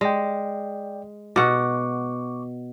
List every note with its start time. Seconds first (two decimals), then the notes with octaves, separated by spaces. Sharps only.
0.01 G#3 D5 G5
1.36 B2 F#5 C#6 D6